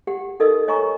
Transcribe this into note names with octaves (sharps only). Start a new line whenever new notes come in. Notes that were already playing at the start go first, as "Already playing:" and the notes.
G4 F#5
D#4 A4 A#4 D#5 E6
C#5 D#5 G#5 A#5 C#6